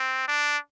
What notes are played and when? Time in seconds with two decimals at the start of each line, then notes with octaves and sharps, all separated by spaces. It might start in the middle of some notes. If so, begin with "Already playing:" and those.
Already playing: C4
0.28 D4